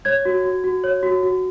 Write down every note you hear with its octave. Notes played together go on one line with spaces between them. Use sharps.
C#5 G#6
F#4
F#4
F#4
C#5
F#4
F#4